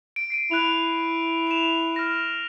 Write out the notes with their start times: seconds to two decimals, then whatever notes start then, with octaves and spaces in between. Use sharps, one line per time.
0.16 D7
0.30 C7 D7 D#7
0.51 E4 F#6 F7
1.47 E7 F7
1.96 F6 A#6